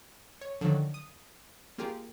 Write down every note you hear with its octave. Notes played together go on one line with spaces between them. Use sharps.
C#5
D3 D#3 F3 F#3
D#6
A#3 F4 G4 G#4 A#4